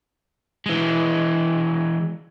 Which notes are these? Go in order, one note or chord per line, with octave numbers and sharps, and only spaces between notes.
E3 G#3